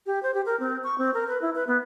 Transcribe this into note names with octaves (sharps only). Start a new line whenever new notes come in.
G4
C5
G4
A#4
C4
C#6
C4
A#4
B4
E4
B4
B3